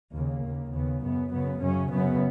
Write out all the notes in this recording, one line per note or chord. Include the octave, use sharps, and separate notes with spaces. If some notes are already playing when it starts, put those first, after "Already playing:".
D#2 C#3 A#3
D#2 C#3
D#2 C#3 B3
F#2 C#3 B3
F#2 C#3 B3
F#2 C#3 C#4
F#2 C#3 B3